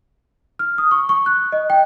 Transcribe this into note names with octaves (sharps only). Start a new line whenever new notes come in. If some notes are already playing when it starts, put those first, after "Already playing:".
F6
D#6
C#6
C#6
F#6
D#5
G5